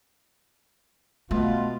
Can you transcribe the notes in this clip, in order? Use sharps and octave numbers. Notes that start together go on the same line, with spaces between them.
B2 A3 F4